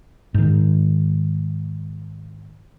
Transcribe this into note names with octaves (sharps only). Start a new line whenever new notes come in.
G#2 D#3